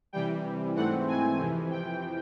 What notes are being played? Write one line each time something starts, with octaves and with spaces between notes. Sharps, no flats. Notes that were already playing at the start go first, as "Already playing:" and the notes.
C3 E3 G3 G5
G#2 E3 A3 C4 F#5
G#5
F2 C3 E3
G5